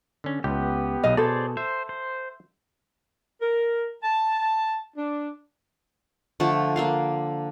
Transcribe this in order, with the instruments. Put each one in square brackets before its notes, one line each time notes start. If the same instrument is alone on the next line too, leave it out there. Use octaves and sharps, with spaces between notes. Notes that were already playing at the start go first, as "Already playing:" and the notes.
[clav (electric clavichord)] D3 C#4
[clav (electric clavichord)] C#2 [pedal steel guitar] B3 G4
[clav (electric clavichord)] B1 F5 [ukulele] D#5
[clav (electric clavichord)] B2 [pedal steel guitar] G#4 C5 D5 [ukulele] A4
[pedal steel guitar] C5 [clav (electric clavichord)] E5
[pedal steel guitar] C5
[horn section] A#4
A5
D4
[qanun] D3 F3 A3
A#3 D4 F5